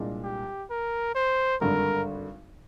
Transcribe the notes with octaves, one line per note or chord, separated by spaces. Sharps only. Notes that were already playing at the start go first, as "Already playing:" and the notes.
Already playing: C2 A#2 G#3 D4
G4
A#4
C5
G#1 G2 D3 A#4